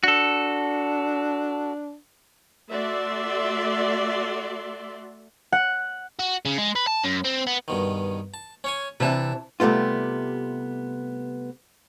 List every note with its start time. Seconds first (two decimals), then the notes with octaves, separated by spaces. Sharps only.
0.04 D4 F#4 A4
2.71 A3 F#4 D5 E5 C6
5.52 F#5
6.19 F#4
6.45 C#3
6.58 G#3
6.75 B4
6.87 A5
7.04 F#2
7.25 C4
7.47 B3
7.68 G2 B2 D#3
8.34 A5
8.64 C#4 C#5 G#5
9.00 C3 E3 D4 E4 A5
9.60 C3 G3 A3 B3 F4